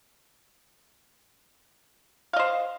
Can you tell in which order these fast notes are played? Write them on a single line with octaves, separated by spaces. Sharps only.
F5 D#5 C5